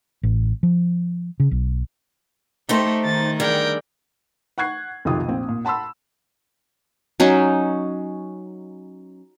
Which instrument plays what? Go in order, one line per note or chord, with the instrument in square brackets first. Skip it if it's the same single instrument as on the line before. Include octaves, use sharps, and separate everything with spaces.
[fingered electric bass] A1
F3
C#3
B1
[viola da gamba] A3 [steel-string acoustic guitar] D#4 G4 C5
[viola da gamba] D#3 [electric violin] A6
[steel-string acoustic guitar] D3 G3 G#4 [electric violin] A#4 G5
[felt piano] F#5 C#6 F#6 G#6 C7
B1 F2 C3 D#3 F4 D#6
A#1 C4
A#2
F#5 A5 B5 C6 E6
[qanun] F#3 C#4 D#4